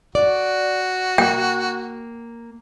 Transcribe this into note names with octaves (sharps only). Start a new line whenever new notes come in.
F#4 D5
A#3 G5